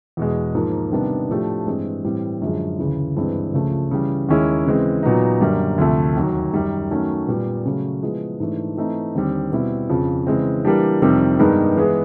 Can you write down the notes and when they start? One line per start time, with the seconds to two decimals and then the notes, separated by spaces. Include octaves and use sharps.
0.17 E2 B2 G#3
0.55 G#2 F3 A#3
0.92 C3 D#3 G3 B3 D4
1.29 A2 F3 A3 D4 G4
1.67 G2 E3 G#3 C4
2.05 A2 E3 G3 C4
2.42 F#2 D3 F3 G#3
2.79 D2 C#3 E3
3.16 G2 E3 G#3 C4
3.54 C#2 C#3 F3 A3
3.91 C#3 E3 G3
4.29 D#2 D#3 G#3 C#4 E4
4.66 C#3 E3 G#3 C4
5.03 A#2 F#3 B3 D#4
5.41 F#2 D3 G3 A#3
5.78 D2 C3 F3 A3
6.15 D#2 D#3 F#3
6.53 F#2 D#3 G3
6.91 D#3 F#3 A3 C#4
7.28 A#2 G3 B3
7.65 C#3 F#3 A3 C#4
8.02 F3 G#3 B3 E4
8.40 G#2 E3 A3 D4
8.77 E3 A3 C4 D#4
9.15 D#2 D3 G3 C4
9.52 B2 G3 C4 E4
9.89 F2 C#3 F3
10.27 C#3 E3 G#3 C4
10.65 E3 G3 A#3 D4 G4
11.02 F2 C3 D#3 G3 C4
11.39 G2 D#3 G#3 B3 D#4
11.77 E3 G#3 B3 E4 G#4